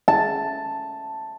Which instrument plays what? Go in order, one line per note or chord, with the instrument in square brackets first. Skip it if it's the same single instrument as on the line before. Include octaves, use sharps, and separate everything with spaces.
[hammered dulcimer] A5